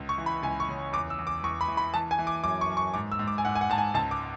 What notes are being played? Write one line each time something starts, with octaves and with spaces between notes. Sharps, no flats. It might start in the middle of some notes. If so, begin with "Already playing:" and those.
Already playing: C#2
C#6
E3
B5
C#2 G#5
C#6
C#3
E2 D6
E6
E2
D6
E2 C#6
B5
E3
B5
E3 A5
G#5
E3
D6
F#2 D6
C#6
F#2
C#6
G#2 D6
E6
G#2
D6
G#5
G#2 F#5
G#5
F#5
G#2 A5
G#5
C#2 A5
D6